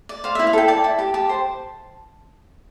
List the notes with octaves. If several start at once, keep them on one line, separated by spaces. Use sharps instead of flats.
D5
C5 F5
E4 E5
F5
A4 G5
D5 A5
E4
G4
G4 A5
C5